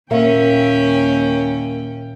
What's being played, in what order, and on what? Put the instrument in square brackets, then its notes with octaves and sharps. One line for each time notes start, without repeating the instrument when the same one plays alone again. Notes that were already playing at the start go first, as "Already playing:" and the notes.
[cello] D#2 G5 [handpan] A#2 E5 F5 [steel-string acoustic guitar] A#3 [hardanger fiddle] C#4